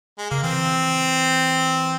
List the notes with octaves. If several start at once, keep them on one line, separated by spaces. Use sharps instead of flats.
G#3
C#3 A#3
E3 C4